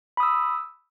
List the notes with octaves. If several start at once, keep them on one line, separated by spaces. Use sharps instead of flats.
B5 D#6 E6